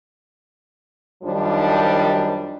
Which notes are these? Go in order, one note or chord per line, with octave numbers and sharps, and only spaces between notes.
F#2 D#3 F3 G3 D4 D#4